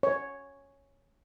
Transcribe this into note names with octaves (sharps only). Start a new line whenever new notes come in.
C#5